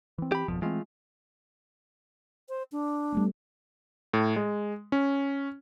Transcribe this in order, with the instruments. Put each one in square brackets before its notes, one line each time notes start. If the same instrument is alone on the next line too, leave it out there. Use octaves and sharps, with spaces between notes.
[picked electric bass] E3 C4
[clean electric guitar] G4 B5
[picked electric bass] G#1 F2 B2 [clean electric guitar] F3
[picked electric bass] E3 C4 [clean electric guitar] G#3 A3 F4
[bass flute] C5
D4
[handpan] G3 A3 B3
[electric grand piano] A2
G#3
C#4